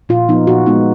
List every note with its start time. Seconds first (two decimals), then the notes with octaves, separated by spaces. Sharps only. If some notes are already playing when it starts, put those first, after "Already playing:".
0.09 A#2 F4
0.28 F3 B3 D#4
0.47 A#2 F#4
0.66 G#3 B3 D#4